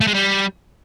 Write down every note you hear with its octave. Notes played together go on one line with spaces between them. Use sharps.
A3
G#3
G3